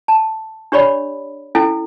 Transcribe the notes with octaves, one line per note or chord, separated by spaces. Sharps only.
A5
D4 G4 C#5 D5 B5
C#4 E4 A4 G#5